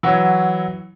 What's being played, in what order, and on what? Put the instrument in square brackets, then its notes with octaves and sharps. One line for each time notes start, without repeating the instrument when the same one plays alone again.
[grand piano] E3 F#3 C#5 [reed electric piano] F#5 E6